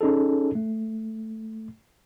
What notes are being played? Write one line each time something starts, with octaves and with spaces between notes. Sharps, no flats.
C#4 D#4 G#4 A4
A3